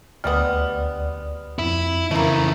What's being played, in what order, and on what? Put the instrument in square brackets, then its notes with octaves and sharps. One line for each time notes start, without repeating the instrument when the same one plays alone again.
[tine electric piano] D2 D5 F6 [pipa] G3 G#3 B3
[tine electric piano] F2 [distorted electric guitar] E4
[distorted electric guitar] C#3 E3 [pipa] A3 A#3